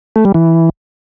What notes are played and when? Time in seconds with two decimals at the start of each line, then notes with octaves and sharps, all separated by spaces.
0.16 A3
0.25 G3
0.34 E3